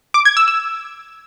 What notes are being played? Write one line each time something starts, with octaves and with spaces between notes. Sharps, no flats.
D6
G#6
E6
E6